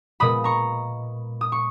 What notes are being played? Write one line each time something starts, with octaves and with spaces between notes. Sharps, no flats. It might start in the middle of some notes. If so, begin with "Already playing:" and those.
A#2 G#3 B3 B5 D#6
A#5 C#6
D#6
C#6